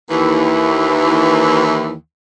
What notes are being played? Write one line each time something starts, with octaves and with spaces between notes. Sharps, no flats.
D#2 E3